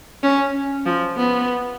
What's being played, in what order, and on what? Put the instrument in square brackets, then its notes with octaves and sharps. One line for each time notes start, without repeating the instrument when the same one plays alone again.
[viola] C#4
F3
B3